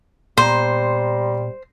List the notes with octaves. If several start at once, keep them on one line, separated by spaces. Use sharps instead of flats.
A#2 G3 B3 C5 A#5 C6